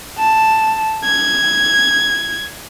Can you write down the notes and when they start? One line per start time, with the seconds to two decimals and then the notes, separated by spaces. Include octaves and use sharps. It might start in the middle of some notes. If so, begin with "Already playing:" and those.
0.18 A5
1.05 G#6